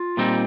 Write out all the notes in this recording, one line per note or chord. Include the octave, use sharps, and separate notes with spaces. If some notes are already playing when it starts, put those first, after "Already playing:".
Already playing: F4
A#2 G3 C4 D#4